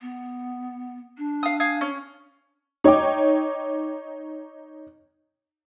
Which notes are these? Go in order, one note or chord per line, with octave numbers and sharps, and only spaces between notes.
B3
D4
F5 D#6
F5 G#5 D#6
C#4
D#4 C#5 D#5 G5 D6